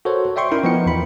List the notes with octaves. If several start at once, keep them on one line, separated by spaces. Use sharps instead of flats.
F#4 A4 A#4 C5 C#5 F#5
D5 E5 G5 C6 C#6
C#4 D#4 E4 A#4 G5
F3 B3 D#4 C#7
E2 B5